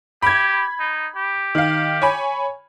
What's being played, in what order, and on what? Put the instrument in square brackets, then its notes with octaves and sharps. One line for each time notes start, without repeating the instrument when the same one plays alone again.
[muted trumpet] G4 [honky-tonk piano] B5 G#6
[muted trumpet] D#4
G4
[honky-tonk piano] D#3 F5
C#5 G#5 B5